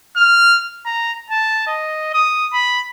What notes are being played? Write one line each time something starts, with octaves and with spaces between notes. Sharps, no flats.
F6
A#5
A5
D#5
D#6
B5